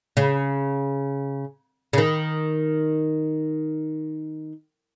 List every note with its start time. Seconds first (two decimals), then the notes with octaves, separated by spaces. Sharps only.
0.17 C#3
1.93 C#3
1.98 D#3